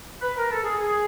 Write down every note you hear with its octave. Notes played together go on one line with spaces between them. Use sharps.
B4
A#4
A4
G#4
G#4